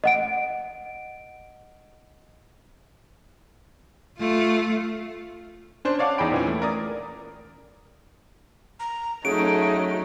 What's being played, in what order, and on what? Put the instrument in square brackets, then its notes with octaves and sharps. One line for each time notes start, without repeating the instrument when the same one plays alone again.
[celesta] D#5 F#5 D7
[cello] A3 F4
[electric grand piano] C#4 D4 C5
C#5 D5 F5 F#5 A5 D6
E2 D#4 G#4 G5 B5 D7
A#2 E3 C#4
A3
A#4 D5 D#6
[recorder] A#5
[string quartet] F#3 A3 D#4 [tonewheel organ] C#4 F#4 [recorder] G#4 [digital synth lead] D7